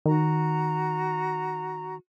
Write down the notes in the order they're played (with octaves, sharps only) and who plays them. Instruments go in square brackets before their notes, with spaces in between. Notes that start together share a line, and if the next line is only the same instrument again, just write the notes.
[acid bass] D#3 [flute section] F#4 A#5